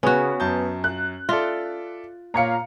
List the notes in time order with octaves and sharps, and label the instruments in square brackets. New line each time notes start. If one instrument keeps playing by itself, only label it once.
[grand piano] C#3 [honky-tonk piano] B3 [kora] C#4 F#4
[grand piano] F#2 A5 G6
[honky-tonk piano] F#6
[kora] F4 [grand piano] A4 D5 E5
[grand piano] A#2 C#5 C#7 [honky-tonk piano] F5 A#5